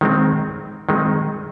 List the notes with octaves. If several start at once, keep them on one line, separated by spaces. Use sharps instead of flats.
D#3 G#3 C4
D#3 G#3 C4